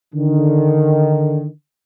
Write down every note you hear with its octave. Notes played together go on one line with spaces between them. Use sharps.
D3 D#3